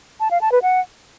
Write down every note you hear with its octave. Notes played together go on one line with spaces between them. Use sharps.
A5
F5
A5
B4
F#5